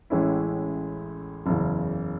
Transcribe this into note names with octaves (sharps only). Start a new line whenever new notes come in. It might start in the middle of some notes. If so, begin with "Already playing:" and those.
A1 A2 G#3 C#4 E4
F#1 E2 C#3